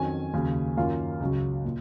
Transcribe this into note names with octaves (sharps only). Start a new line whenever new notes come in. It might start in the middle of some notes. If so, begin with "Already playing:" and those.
Already playing: F2 D#3 F#3 C#4 G#5
D#2 C#3 F#3
F#2 D#3 A#3 F4 F5
C#2 C#3 F#3
A#2